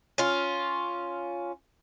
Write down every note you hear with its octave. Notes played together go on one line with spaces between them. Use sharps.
C#4 F4